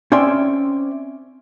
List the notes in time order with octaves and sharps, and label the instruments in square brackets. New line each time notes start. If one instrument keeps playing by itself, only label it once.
[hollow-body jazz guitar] C4 C#4 D5 E5 G5 C6